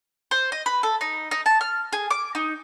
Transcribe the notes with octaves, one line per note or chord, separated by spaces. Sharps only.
C5
D#5
B4
A4
D#4
D#4
A5
F6
G#4
D6
D#4